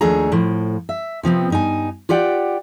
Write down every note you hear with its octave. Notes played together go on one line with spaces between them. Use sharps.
D#2 F3 A3 D4 G#4 A#5
A2 F3
E5
C3 F3 B3 C4
G2 D#4 G#5
F4 G4 D5 F#5 G5